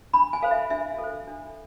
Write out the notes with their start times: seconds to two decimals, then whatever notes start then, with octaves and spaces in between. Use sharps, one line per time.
0.13 D4 B5
0.33 G#5
0.42 A4 C5 F5
0.51 E5
0.70 D4 E5
0.98 A4
1.04 C5
1.27 D4